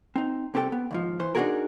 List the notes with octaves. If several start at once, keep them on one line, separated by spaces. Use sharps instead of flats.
C4 D#4
C2 C4 G4 A4 G5
B3
D#2 G#2 F3
E3 C5
D4 D#4 F4 F#4 G#4 A#4